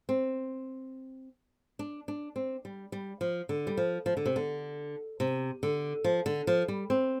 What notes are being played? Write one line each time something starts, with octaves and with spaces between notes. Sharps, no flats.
C4
D4
D4
C4
G3
G3
F3
D3
G3
F3
F3
D3
C3
D3
C3
D3
F3
D3
F3
G3
C4